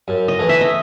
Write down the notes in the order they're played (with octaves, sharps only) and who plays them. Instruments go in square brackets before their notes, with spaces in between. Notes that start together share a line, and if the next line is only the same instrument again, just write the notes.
[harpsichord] F#2
[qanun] D#5
[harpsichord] E3 A3
[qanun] E5
D#5